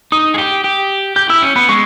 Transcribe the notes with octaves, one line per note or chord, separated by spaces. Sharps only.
D#4 D#6
G#4
G4
G4
G4 G6
E4 E6
C#4
B3 B5
G#3 C#6